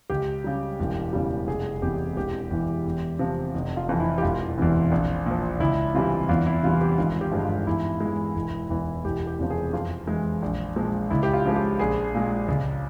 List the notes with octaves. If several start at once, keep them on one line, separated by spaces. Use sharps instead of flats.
C#2 G4
C#3 G3
E1
E2 C#3 G3
F1 G#4
E2 C3 G4
E1 G4
E2 E3
E2
C3 F3
F1
F4
F2 E3
E4
G4
E1 F4
E2 C3 E3
A#1
A#2 F3
C#2 E4
C3 E3 G3 F4
E2 F4
E4
C3 E3 G3 F4
G4
G#1 F4
G4
G2 F3 G#3
F4
E2 E4
G#3
E3
E1
E2 E3
E1 G4
G4
E2 C3 F3
G#4
F2 F4
E3 G#3
A#1
A#2 F3 G#3
C#2 E4
G4
F4
C#3 F3 G#3
G4
A#1 G#4
A#2 G#3
C#2